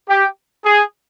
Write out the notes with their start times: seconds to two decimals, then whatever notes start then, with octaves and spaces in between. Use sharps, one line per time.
0.08 G4
0.65 G#4